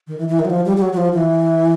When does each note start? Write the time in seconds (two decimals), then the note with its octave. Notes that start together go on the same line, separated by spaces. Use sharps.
0.07 D#3
0.18 E3
0.28 E3
0.39 D#3
0.45 F#3
0.50 F3
0.66 G3
0.77 G3
0.82 F#3
0.93 F#3
0.97 F3
1.13 E3